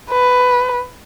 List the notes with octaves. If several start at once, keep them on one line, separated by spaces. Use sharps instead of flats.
B4